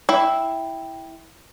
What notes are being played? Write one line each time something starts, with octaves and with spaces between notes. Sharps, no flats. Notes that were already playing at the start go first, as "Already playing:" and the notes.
E4 E5 G5